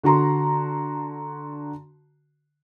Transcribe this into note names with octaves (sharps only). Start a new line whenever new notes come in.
D3 F#4 A#5 C6